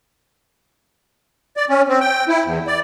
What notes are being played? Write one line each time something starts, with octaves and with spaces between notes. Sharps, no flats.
D5
C#4
C4
G5
E4
E2
D5